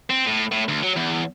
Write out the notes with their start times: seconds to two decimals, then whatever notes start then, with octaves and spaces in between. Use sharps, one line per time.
0.10 C4
0.27 A2
0.52 A2
0.68 D2
0.83 F#3
0.96 E2